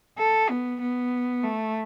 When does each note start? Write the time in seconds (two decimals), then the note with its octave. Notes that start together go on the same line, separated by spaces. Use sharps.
0.18 A4
0.49 B3
0.80 B3
1.43 A3